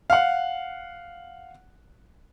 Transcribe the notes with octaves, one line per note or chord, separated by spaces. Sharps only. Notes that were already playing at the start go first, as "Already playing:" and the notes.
F5 F#5